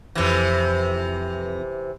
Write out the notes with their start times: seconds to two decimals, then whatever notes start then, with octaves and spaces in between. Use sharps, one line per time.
0.15 F2 C3 E3 B4 A#6